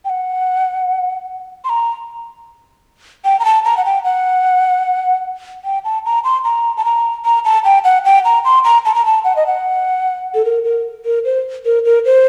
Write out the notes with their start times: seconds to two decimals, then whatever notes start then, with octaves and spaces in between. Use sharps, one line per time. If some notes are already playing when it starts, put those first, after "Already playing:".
0.05 G5
0.10 F#5
1.64 C6
1.69 A#5
3.25 G5
3.40 A#5
3.45 A5
3.65 A#5
3.77 F#5
3.85 G5
4.05 F#5
5.65 G5
5.85 A5
6.05 A#5
6.24 C6
6.44 A#5
6.77 A5
6.85 A#5
7.25 A#5
7.45 A5
7.64 G5
7.84 F#5
8.05 G5
8.25 A#5
8.45 C6
8.64 A#5
8.85 A5
8.95 A#5
9.06 A5
9.24 F#5
9.36 D#5
9.47 F#5
10.35 A4
10.45 A#4
10.64 A#4
11.05 A#4
11.25 C5
11.65 A#4
11.85 A#4
12.05 C5